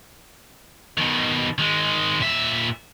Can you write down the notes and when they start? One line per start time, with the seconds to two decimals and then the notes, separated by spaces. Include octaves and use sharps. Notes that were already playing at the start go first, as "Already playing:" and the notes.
0.98 B2 D#3
1.58 D#3 G#3
2.20 A#2 E5